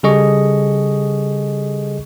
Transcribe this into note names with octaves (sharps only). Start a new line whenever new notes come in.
C#3 G3 G#4 A4 D#5 C#6